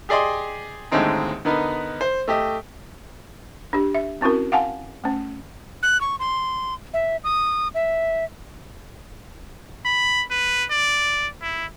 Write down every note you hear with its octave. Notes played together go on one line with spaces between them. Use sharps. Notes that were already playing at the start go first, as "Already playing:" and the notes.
G4 G#4 D5 D#5 C6
D#2 A2 D3 G#3 C4 D#4
D3 B3 D#4 A#4 B4
C5
A3 G4 D#5
D4 G4
E5
C4 C#4 E4 F#4 A#4
F5 F#5 G#5 A5
A3 C#4
F#6
C#6
C6
E5
D#6
E5
B5
B4
D5
E4